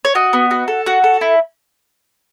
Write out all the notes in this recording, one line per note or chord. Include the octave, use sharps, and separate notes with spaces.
C#5
F#4 D#5
B3
F#4
A4
F#4
A4
E4